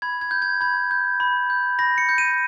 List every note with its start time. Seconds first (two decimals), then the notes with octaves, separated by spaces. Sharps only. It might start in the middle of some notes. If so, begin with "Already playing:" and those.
0.02 B5 G#6
0.21 G#6
0.31 G6
0.42 G#6
0.61 B5 G#6
0.91 G6
1.20 B5
1.50 G6
1.79 B5 A#6
1.98 C#7
2.09 G6
2.18 D#7